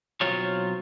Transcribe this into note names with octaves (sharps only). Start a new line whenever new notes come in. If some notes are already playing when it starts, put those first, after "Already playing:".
B1 F#3 C4 F4 C#5